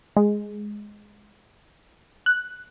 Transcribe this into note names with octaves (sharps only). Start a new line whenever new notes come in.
G#3
F#6